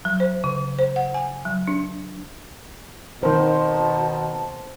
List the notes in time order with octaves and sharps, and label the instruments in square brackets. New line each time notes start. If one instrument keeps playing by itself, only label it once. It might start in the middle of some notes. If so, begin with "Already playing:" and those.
[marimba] F#3
C5
C#3
C5
F#5
G#5
F#3
D4
[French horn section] B2 [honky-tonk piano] D#3 A#4 [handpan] C5 [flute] A5